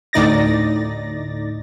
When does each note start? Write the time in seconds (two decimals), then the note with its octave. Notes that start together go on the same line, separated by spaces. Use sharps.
0.13 D2 A2 D#4 D5 A6 A#6